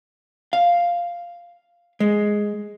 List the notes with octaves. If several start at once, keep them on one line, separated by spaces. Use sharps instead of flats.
F5
G#3